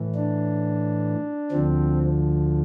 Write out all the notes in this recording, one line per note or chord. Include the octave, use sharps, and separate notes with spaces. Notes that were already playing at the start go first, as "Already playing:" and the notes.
Already playing: A2 E3
D4
D2 D3 F3 C4